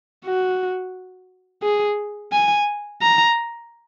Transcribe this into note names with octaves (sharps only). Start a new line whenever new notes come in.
F#4
G#4
G#5
A#5